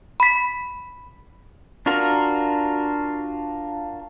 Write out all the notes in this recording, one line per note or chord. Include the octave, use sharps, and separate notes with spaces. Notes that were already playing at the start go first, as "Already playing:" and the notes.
B5 B6
D4 F4 F#4 A#4